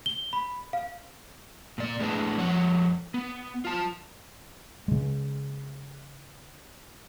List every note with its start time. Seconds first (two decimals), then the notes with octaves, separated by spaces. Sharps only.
0.06 G7
0.33 B5
0.73 F5
1.78 A#2 D5
2.00 A2 G#3 B3 D4
2.38 F2 F3 C#5 F#5
3.14 B3
3.65 F4 A5
4.88 C#3 G#3